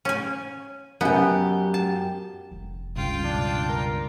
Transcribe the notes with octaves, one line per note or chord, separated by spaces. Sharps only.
C#4 G#5
F#2 B3 G4
A5
F1
C#2 G2 C#3 F4 G5
B2 D4
A#4